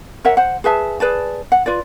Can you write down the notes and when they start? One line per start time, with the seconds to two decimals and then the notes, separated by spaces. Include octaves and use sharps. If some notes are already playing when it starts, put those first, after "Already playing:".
0.25 A#4 C#5 E5 F#5
0.37 C5 F#5
0.64 G#4 B4 E5 A5
1.00 G#4 B4 D5 A5
1.52 F#5
1.66 F4 B4 D5